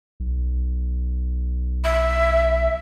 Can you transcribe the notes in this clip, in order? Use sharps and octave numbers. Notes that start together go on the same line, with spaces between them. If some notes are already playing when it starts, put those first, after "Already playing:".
B1
E5